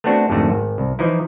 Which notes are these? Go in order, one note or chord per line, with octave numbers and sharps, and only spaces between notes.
A3 B3 C4 D4 F#4
G#1 F2 G#2 D3 A3 F#4
G#1
C2
E3 F3 D#4 E4